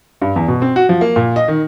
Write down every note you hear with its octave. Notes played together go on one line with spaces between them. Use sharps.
G2
E2
B2
C4
F#4
F3
A#3
A#2
D#5
D#3